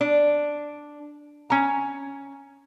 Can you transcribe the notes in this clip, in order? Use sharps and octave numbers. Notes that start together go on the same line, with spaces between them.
D4
C#4 A#5